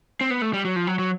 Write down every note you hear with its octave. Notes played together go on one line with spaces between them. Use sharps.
C4
B3
A3
G3
F#3
F3
F#3
F#3